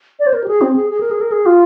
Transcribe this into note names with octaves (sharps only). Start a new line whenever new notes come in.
D5
C5
A#4
G4
G#4
C4
G#4
G#4
A#4
G#4
A#4
G#4
F4